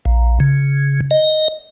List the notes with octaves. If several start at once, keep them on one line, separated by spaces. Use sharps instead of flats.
A#1
C#3
D#5